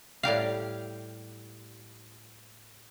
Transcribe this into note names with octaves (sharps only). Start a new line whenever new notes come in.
A2 G3 G4 F5